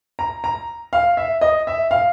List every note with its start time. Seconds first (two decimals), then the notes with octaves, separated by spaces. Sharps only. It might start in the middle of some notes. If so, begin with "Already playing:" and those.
0.19 A#5
0.44 A#5
0.93 F5
1.17 E5
1.41 D#5
1.67 E5
1.91 F5